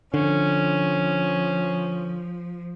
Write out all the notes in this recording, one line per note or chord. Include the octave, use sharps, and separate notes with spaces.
D3 F3 C#4